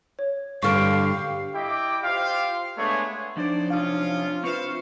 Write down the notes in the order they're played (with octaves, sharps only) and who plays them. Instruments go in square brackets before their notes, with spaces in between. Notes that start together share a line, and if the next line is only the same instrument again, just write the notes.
[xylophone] C#5
[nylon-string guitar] G2 D3 [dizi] G4 [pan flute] F5 [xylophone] C#6 F6 D7
[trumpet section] E4 G4 D#5 G5 D6
F4 G4 C5 F5
G#3 A3 B3 D4 G#4 C#5
[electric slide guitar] F3 F#3 D#4 [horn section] C4 C5 D5 [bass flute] D4
[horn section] C3 C#4 F4 [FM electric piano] F5 D#6
[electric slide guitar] C4 E5 [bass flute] F4 [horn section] B4 C5 F5 [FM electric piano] C#6 C#7